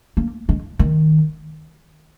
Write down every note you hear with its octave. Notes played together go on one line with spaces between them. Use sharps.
A#3
G#3
D#3